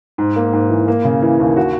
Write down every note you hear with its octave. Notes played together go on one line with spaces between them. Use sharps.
G#2
A#3
G#2
E3
A#3
C#3
E3
D#2
F#4